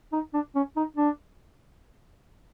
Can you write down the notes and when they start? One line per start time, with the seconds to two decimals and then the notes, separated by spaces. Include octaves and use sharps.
0.13 D#4
0.33 D4
0.55 C#4
0.76 D#4
0.97 D4